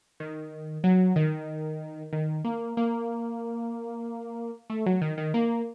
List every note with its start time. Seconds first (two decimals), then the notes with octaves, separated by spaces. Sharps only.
0.20 D#3
0.84 F#3
1.16 D#3
2.13 D#3
2.44 A#3
2.77 A#3
4.70 A3
4.86 F#3
5.01 D#3
5.18 D#3
5.34 A#3